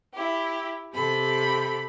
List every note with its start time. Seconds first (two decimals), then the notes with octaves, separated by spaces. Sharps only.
0.15 E4 G4
0.94 C3 G4 A4 B5